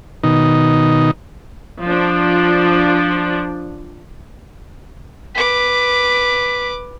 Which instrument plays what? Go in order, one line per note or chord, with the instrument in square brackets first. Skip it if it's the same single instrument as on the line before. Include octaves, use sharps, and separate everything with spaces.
[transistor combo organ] B2 D#3 D#4
[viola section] F3 D4
[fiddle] B4 D6 [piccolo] B6